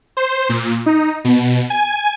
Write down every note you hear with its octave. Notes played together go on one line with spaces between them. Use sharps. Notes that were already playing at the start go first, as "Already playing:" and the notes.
C5
A#2
D#4
B2
G#5